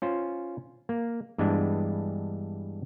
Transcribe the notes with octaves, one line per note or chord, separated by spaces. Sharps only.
C#4 F4 C5
A#3
G2 E3 G#3 B3 D4